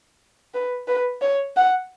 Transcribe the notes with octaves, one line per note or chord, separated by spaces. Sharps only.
B4
B4
C#5
F#5